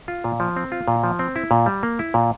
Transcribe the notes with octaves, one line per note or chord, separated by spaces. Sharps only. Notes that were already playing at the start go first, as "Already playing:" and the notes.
F4
A#2
F3
C4
F4
A#2
F3
C4
E4
A#2
G3
A#3
E4
A#2